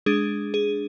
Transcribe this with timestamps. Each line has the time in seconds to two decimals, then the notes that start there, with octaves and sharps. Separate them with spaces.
0.06 G#3 D4 G#4
0.54 G#4